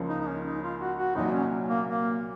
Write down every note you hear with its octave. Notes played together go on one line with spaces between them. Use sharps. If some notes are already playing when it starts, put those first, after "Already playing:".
Already playing: C#2 C#3 F3 A#3
D#4
D#4
C#4
D#4
F4
F#4
F#4
C2 A#2 F#3 D#4
C#4
A#3
A#3